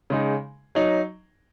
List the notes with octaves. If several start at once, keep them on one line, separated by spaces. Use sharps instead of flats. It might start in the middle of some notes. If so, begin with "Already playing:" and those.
C#3 G#3 D#4
F#3 D#4